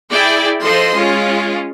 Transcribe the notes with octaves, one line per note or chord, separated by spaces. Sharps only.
E4 G#4 D5 G5
F3 A4 C5 D#5 C6
G#3 C#4 F4